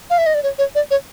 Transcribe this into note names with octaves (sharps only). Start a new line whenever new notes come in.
F5
E5
D#5
D5
C#5
C#5
D5
C#5